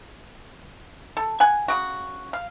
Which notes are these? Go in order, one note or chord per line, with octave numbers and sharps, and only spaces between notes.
A4
F#5 G#5
C#3 F#4
F5